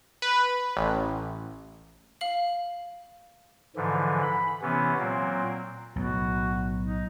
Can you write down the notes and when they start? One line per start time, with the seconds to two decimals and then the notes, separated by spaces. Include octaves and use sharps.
0.22 B4
0.77 A1
2.21 F5 F#7
3.76 G#2 D3 E3 F3
4.23 B5
4.62 C3 E3 B3 C#4
5.00 A#2 F#3 A#3 C4
5.96 B1 A2 F#4
6.84 D#4